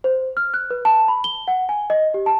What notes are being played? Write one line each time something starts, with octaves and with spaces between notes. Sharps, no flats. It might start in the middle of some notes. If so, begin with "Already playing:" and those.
C5
F6
F#6
B4
A5
B5
G7
F#5
G#5
D#5
G4
A5